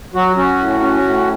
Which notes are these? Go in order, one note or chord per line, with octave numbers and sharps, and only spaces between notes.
F#3 F#4
C#4 F#4
A2
C#4
A2